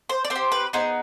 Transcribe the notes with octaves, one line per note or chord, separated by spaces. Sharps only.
C5
D5
C4 C5
G4
B4
B3 D#4 G#4 C5